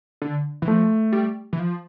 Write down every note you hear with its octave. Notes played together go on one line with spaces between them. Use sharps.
D3
E3
F3 A3
G3
E3
F3